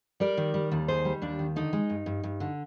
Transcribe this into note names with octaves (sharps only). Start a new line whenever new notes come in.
G3 A#4 D5
D#3
G3
D#2
D#3 G#4 C5
G3
D#2 D4
D#3
D3 D#4
G#3
G2
G2
G2
D3